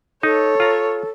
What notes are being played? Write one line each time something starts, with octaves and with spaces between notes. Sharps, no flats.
D#4 A4 C#5
F4 A#5